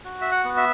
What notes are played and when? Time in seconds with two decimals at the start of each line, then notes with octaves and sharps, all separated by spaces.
0.05 F#4
0.21 E5
0.31 F#5
0.44 B3
0.57 E5